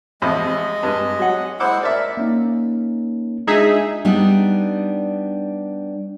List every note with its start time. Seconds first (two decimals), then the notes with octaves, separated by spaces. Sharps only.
0.22 A1 F2 G#3 D#5
0.83 G2
1.19 F#3 F#5
1.60 G#3 E4 C5 F#5 D6 E6
1.83 A#4 D5 E5
2.17 A#3 C#4 D#4
3.47 G#3 D4 D#4 F4 G#4 E5
4.05 G3 B3 D4 D#4